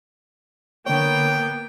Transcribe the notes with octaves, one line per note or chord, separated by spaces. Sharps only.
D3 A#3 B3 C#5 G5